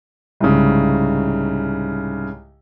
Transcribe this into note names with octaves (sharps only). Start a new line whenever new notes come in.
C2 G#2 C#3